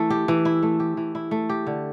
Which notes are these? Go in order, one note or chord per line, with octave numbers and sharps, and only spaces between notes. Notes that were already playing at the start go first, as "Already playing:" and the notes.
Already playing: E3 A3 E4
G4
E3
E4
A3
G4
E3
E4
A3
G4
D3